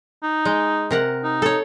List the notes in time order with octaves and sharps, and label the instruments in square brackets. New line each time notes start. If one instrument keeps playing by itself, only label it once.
[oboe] D#4
[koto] G#3
C3 A#4 F#5
[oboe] D#4
[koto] A4 C#5